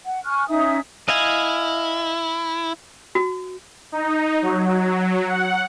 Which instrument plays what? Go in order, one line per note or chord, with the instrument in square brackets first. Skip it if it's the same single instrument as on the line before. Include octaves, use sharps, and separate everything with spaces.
[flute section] F#5
G#5 C#6 F6 F#6
C#4 D#4 E5 D#6
[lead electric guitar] E4 [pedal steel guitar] D#5 F5 G#5
[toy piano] F#4
[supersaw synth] D#4
F#3
F#5